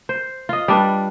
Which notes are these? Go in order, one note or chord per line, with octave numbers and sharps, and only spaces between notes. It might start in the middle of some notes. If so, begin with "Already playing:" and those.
C5
F4 D#5
G3 D4 B4